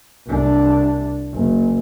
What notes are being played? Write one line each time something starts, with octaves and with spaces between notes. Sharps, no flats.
C2 D4
F#1